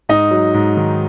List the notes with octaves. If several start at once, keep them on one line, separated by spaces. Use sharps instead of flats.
G#2 D#4 D#5
F#3
G#2
D#3